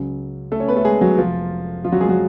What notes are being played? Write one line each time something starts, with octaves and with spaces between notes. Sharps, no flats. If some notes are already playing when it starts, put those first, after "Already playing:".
Already playing: C#2 C#3 F#3
A3 A4
C#4 C#5
B3 B4
A3 A4
G#3 G#4
F#3 F#4
F1 F2 F3 F4
F3 F4
F#3 F#4
G#3 G#4
F#3 F#4